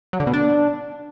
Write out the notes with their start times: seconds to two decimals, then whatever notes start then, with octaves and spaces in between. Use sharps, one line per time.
0.13 F#3
0.20 D3
0.27 B2
0.34 D4